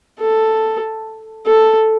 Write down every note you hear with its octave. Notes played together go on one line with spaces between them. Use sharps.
A4
A4